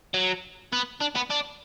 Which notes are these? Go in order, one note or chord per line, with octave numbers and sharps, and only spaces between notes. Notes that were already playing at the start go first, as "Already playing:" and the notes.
F#3
B3
D4
B3
D4